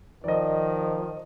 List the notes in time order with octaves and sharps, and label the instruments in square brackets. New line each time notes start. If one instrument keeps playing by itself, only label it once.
[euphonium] D#3 [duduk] F3 [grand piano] D5 D#5